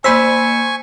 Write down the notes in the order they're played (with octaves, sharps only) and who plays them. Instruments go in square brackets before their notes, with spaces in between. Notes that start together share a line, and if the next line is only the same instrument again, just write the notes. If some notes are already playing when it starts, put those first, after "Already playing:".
[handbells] A#3 B5 E6 [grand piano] C5 B6 [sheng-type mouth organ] G#5 C#6